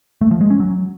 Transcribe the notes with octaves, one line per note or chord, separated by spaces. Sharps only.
A3
F3
G#3
C#4
F#3